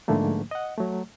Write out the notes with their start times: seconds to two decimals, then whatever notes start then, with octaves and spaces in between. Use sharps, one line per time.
0.08 G#2 D3 F3 A3 A#3
0.51 D#5 F#5
0.77 F#3 A3